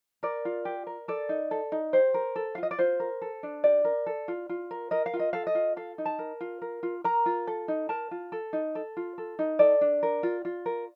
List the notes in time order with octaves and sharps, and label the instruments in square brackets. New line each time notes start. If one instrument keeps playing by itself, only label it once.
[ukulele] A#4 D5
F4
G4
A#4
A4 D5
D#4
A4
D#4
G4 C5
A#4
A4
F5
F4
D#5
D5
F4 C5
A#4
A4
D4
G4 D5
A#4
A4
F4
F4
A#4
A#4 D#5
F5
F4
D#5
A4 F5
D#5
F4
A4 F5
D#4
A5
A#4
F4
A#4
F4
A#4 A#5
F4
A4
D#4
A#4 A5
F4
A4
D#4
A4
F4
A4
D#4
A4 D5
D4
A#4
F4
F4
A#4